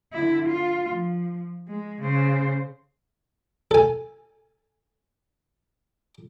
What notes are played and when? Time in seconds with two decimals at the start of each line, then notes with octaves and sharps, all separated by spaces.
0.13 D3 E4
0.49 F4
0.90 F3
1.68 G#3
2.02 C#3 C5
3.71 A4 G#5